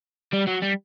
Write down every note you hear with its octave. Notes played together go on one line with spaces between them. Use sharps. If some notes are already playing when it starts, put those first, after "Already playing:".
G3
F#3
G3